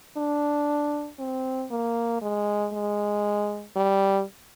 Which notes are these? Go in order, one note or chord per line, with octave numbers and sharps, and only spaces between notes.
D4
C4
A#3
G#3
G#3
G3